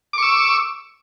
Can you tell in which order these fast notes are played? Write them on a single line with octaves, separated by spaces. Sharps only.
D6 C#6 E6